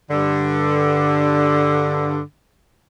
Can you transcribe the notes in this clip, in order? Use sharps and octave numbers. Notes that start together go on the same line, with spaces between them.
G2 D3